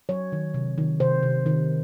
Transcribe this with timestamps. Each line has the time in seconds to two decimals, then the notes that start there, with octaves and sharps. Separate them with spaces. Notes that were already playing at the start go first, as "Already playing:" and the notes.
0.09 F#3 C#5
0.32 D#3
0.54 C3
0.78 D#3
1.00 C3 C5
1.23 C3
1.46 D#3